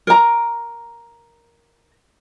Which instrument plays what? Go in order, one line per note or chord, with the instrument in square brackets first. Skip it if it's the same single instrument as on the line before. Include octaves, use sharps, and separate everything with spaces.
[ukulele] A#4 A#5